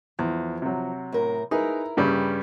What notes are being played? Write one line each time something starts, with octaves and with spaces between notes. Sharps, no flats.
E2 F3
C3 F#3
A2 A#4
D#4 E4 G#4 A#4 B4
G2 C#3 G3